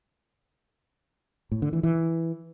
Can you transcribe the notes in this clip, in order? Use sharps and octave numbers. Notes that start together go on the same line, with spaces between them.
A2
D3
E3
E3